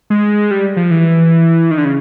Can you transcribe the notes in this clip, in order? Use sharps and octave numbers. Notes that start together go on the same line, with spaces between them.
G#3
G3
F3
E3
D#3
D3
C#3